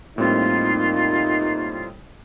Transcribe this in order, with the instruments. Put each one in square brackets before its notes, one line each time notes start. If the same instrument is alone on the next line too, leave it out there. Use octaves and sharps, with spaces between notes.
[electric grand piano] A2 G3 C4 [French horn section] A#3 D#4 [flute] F4